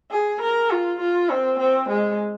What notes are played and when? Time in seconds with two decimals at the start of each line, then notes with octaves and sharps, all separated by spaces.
0.11 G#4
0.41 A#4
0.70 F4
1.00 F4
1.30 C4
1.59 C4
1.89 G#3